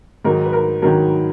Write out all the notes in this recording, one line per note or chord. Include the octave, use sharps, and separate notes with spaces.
G#2 D#3 F#3 A#4
B4
A#4
G#2 D#3 F#3 A#4